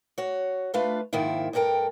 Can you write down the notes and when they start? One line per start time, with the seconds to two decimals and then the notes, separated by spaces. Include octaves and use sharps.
0.18 F#4 C#5
0.74 A3 D4 F4 B4 F5
1.13 F2 G#2 D#3 F3 A#3 E4
1.53 D2 G2 A4 A#4 G5